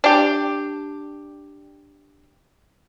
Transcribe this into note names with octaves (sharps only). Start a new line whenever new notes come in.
D4 G4